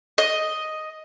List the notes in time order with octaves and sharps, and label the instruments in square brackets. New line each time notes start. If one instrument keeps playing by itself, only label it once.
[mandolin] D#5